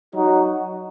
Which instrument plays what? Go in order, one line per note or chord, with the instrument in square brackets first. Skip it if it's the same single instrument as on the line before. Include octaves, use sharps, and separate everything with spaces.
[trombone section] F#3 D#4 F#4